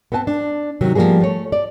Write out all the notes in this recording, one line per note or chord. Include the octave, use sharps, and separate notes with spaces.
B3 C4 B4 G#5 A5
D4
C3 D#3 F#3
F3 G3 A#3 B3 G#4
A3 C#5
D5